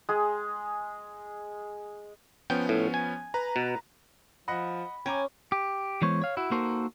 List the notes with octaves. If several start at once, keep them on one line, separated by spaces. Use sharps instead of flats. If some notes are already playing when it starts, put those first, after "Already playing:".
G#3 G#4
F3 B3 C#4 G5
A2
G#5
B4 A#5
B2
F3 D#5 F#5 B5 A#6
C#4 G5 G#5 A#5 D6
G4
E3 G#3 B3 C5 C#5
C#5 F5
E4 F#4
A#3 D#4 F#4 A4 A#4 C5